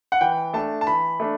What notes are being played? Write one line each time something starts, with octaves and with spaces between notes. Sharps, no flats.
F#5
E3 G5
A3 D4 A5
A5
E3 B5
A3 D4